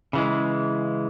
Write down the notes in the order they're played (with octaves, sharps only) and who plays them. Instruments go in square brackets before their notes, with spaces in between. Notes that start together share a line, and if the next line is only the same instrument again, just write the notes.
[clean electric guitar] C#3 E3 G#3